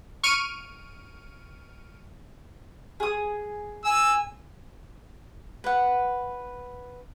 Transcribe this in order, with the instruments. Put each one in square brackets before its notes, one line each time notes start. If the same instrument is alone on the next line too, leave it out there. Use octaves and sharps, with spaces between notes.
[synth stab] C#6 F6 D7 D#7
[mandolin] G#4 D#6
[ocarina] G#5 [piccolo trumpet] E6
[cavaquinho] B4 F#5